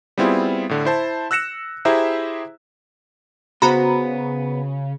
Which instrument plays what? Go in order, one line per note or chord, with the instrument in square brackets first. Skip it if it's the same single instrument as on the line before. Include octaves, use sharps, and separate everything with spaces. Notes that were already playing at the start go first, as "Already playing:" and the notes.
[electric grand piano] G3 B3 C4 E4 F4 G#4
A2 D3
E4 C5 A5
E6 F#6 A#6 C#7 E7
E4 G4 G#4 C5 E5 A#5
[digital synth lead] C#3 [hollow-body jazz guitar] B3 C5 [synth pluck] F#4 A#5 B5